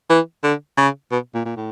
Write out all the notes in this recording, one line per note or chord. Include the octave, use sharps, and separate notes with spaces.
E3
D3
C#3
B2
A#2
A#2
A2